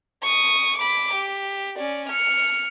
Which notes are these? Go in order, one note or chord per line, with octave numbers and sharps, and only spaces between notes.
C#6 D#6
B5 D6
G4
C#4 D5
F6 C#7